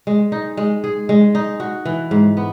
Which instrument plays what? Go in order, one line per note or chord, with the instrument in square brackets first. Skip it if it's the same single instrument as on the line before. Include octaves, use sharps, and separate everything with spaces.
[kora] G#3
D#4
G#3
G#4
G#3
D#4
F#4
E3
G#2
B3